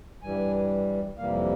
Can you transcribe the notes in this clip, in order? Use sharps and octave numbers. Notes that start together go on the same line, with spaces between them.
G2 E3 G3 G#5
F2 C3 E3 G3 A#3 F5